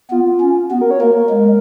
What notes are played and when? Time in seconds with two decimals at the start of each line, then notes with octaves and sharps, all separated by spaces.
0.11 B3 F4
0.26 F4
0.41 C#4
0.70 B3 F#4
0.81 A#4
0.91 C#5
1.00 A#3 A#4
1.16 A#4
1.30 G#3